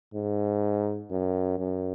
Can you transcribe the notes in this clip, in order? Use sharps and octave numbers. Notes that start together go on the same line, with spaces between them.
G#2
F#2
F#2